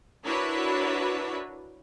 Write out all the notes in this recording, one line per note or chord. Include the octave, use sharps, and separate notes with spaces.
D4 E4 F#4 A#4 B4 C#5